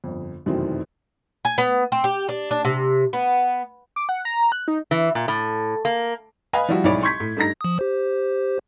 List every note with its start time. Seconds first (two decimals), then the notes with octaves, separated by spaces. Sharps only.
0.04 G1 F2
0.46 F1 F#2 B2 D#3 E3 C4
1.45 G#5
1.58 B3
1.92 C4
2.04 G4
2.29 D4
2.51 D4
2.65 C3
3.13 B3
3.96 D6
4.09 F#5
4.25 A#5
4.52 F#6
4.68 D#4
4.91 E3
5.15 A#2
5.28 A2
5.85 A#3
6.53 B4 D#5 F5 G#5 B5
6.69 F3 G3 E4 F#4
6.84 B1 G#2 E4 C#5 D5 B5
7.03 C6 C#6 G6 G#6 B6
7.20 A2
7.37 G2 A3 D#4 A#5 A#6
7.61 F3 D#6
7.79 G4 C5